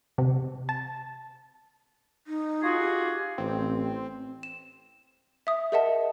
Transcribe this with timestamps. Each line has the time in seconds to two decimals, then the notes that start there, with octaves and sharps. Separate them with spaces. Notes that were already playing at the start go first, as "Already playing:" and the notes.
0.18 C3
0.69 A5
2.27 D#4
2.63 F4 F#4 G#4
2.80 G4
3.38 A1 C4
4.43 E7
5.47 E5 D#6
5.72 G#4 A#4 D#5 E5 F#5 A5